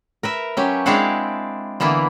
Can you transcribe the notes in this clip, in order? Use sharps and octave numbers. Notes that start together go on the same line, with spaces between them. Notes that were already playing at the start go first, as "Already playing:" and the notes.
A#4 B4 E5
F#3 C#4 G4
G#3 C4 D4 E4 F5 F#5
D3 E3 A#3 B3 E4